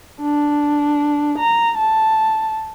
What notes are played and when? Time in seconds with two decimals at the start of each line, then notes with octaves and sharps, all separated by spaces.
0.21 D4
1.39 A#5
1.77 A5